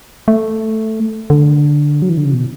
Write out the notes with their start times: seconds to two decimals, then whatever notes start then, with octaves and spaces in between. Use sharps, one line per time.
0.28 A3
1.30 D3
2.02 F#3
2.09 E3
2.17 D3
2.25 C#3
2.34 B2